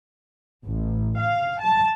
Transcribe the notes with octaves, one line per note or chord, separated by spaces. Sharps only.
A1
F5
A5